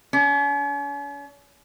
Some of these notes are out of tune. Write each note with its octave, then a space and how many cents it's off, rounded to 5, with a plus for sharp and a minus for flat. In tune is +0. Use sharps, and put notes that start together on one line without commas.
C#4 +40